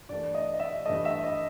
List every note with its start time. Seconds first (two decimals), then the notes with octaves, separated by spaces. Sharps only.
0.09 G2 E3 A3 D5
0.34 D#5
0.54 D#5
0.60 E5
0.86 G2 E3 A3 D#5
1.05 E5
1.24 D#5